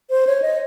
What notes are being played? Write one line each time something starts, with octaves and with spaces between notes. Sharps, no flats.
C5
C#5
D#5